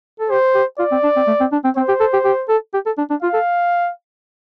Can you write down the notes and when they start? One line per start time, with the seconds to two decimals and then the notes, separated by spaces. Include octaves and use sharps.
0.20 A4
0.30 G4 C5
0.55 G4
0.79 F4 D5
0.92 C4
1.03 D4
1.16 C4
1.27 A3
1.40 C4
1.52 D4
1.64 C4
1.77 C4 C5
1.88 G4
2.00 A4
2.13 G4
2.25 G4
2.49 A4
2.74 G4
2.86 A4
2.98 D4
3.10 D4
3.22 F4 F5
3.34 A4